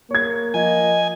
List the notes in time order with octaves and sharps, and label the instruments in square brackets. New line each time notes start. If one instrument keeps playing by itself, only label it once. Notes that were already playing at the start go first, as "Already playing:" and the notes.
[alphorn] A#3 [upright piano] C#5 G#6
[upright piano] F3 [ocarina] D#5 [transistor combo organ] G#5